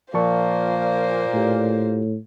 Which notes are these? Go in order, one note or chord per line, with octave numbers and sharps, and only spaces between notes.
A#2 F3 A#3 C5 A5 C#6
A2 F4 G4